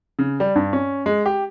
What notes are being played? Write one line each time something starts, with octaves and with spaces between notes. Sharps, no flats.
C#3
G3
G2
C#4
G#3
G4